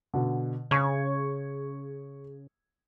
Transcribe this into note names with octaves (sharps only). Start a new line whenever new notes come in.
B2 D3
C#3 C#6 G#6